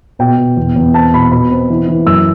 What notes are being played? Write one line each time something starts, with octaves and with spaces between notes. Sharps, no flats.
B2 G5
B2
E2
E2
C4 A5
B2 B5
B2 B5
C4
E3
E3
F#2 E6